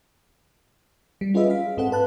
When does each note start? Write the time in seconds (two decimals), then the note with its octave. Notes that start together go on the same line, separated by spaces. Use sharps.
1.21 G3
1.34 C#4 F4 G#4 B4 D#5 E5
1.50 F5 B6
1.77 G#2 C4 A4 F#5
1.92 B4 A5 F#6